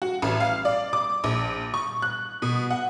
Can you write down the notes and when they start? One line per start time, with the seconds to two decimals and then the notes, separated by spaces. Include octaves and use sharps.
0.02 F#4
0.22 A1
0.40 F5
0.65 D5
0.93 D6
1.24 A#1
1.74 C#6
2.02 F#6
2.42 B2
2.71 F#5